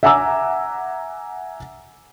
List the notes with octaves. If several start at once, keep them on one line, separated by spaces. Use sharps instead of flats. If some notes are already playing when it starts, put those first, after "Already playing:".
E5 F#5 G#5 A#5 D6 E6